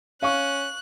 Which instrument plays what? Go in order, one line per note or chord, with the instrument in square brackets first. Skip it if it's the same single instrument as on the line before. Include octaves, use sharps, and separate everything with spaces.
[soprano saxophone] C#4 [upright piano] F5 C#6 [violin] F#6